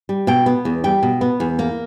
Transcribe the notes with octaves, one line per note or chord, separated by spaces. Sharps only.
G3
B2 G5
B3
E2
G3 G5
B2
B3
E2
A#3